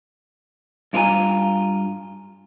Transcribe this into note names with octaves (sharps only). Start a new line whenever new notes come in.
G2 E4 F4 B4 G#5 A#5